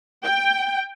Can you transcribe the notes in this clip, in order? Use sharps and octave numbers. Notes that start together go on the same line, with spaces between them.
G5